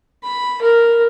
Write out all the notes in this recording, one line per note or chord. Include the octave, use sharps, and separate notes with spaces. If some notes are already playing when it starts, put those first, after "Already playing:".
B5
A#4